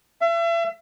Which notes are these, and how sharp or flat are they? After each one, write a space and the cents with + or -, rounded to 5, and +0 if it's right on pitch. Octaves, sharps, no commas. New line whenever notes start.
E5 +40